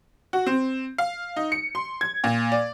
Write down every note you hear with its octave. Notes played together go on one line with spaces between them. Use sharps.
F#4
C4
F5
D#4
C#7
C6
G#6
A#2
D5